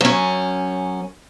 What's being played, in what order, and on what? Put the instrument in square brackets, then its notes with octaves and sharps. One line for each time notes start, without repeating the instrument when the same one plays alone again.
[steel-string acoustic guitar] F#2 C#4